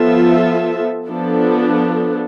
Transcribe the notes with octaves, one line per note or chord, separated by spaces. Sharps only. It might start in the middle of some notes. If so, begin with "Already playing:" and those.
Already playing: F3 B3 F4 A4 E5
F3 B3 D4 A4